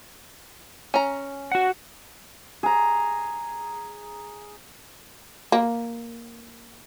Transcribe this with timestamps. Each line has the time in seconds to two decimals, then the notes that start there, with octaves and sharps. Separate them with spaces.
0.94 C#4 A#5
1.52 F#4 F#5
2.63 G#4 A#5
5.52 A#3